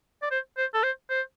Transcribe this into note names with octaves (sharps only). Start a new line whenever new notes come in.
D5
C5
C5
A4
C5
C5